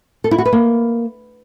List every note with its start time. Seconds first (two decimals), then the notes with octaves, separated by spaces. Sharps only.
0.24 A4
0.31 E4
0.38 F#4
0.46 B4
0.53 A#3